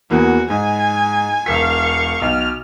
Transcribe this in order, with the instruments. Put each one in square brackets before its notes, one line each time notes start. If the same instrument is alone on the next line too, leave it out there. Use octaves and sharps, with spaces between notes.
[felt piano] E2 E3 A#3 [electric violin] F#4
[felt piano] G#2 [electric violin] G#5
[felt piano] E1 A#4 B6 [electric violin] F5 C#6
[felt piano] B1 [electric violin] F6